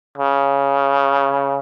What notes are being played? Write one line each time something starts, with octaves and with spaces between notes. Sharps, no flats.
C#3